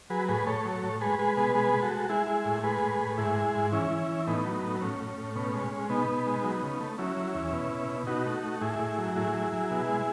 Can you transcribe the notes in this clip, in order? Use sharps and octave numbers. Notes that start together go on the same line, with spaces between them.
F#3 G#4 B4
A2 G#4 B4
A2 A4 C#5
F#3
A2
G#3 G#4 B4
G#3 G#4 B4
B2 G#4 B4
G#3 G#4 B4
G#3
F#4 A4
G#3
G#3 E4 G#4
G#3
A2
G#3 G#4 B4
A2
A2
G#2 E4 G#4
G#3
G#2
E3 C#4 E4
E3
E3
A2 B3 D#4
F#3
A2
A2 C#4
A2
A2
B2 C#4
G#3
G#3
B2 B3 D#4
B2
G#3
F#3
C#3
A3
F#3 C#4 E4
F#3
E2
B2
B2
B2
B2 D#4 F#4
A3
A3
A2 E4 G#4
A2
F#3
A2 E4 G#4
F#3
F#3
B2
G#3